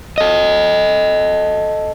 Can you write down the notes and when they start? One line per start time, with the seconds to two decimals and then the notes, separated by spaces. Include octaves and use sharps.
0.18 A4 D#5